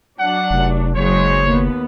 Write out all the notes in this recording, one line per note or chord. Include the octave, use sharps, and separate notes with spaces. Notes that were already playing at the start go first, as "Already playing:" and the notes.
F#3 D4 F#5
F1
F#1 F#3 G#3 C5 C#5
D#2 B3